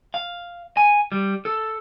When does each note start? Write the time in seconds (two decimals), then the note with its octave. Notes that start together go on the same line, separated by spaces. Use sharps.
0.14 F5
0.77 G#5
1.12 G3
1.45 A4